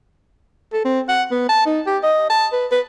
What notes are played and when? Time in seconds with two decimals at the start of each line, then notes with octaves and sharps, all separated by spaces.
0.73 A4
0.85 C4
1.09 F#5
1.31 B3
1.49 A5
1.66 D#4
1.87 G4
2.03 D#5
2.30 A5
2.53 B4
2.71 B4